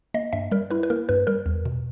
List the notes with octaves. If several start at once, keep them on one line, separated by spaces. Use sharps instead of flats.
A#3 D#5
G2 E5
G3 A#4
E4 B4
B4
A#3 A#4
G2 B4
G3 A#4
E2
B2